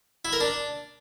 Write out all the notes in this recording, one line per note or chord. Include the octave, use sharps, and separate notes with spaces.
E4
A#4
D4